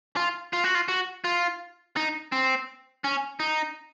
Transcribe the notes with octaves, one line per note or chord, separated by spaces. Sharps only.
F4
F4
F#4
F4
F#4
F4
D#4
C4
C#4
D#4